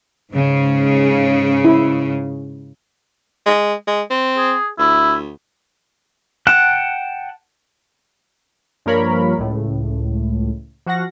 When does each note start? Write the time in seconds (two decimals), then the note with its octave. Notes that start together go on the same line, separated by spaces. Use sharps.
0.31 G#2 C#3
1.65 E4
3.46 G#3
3.88 G#3
4.10 C4
4.37 G#4
4.79 D2 E4
6.47 F#5 G5 A5 F#6
8.86 G2 F3 A#3 A#4 C#5 B5
9.38 C#2 A2
10.86 F3 F#4 F5 F#5 A#6